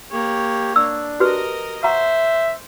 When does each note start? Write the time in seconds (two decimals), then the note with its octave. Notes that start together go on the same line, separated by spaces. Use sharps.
0.11 A#3 G4 C#5
0.76 D4 E6
1.20 F#4 G4 A#4 B4 D#5
1.84 C5 E5 F#5 A#5 C#6